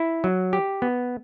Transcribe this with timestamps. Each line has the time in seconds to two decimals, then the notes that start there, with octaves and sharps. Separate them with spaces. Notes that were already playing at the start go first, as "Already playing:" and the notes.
Already playing: E4
0.24 F#3
0.53 G4
0.82 B3